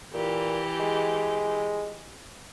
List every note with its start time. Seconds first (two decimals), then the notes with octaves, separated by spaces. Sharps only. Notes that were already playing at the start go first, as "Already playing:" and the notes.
0.14 A#2 E3 G4
0.80 G#3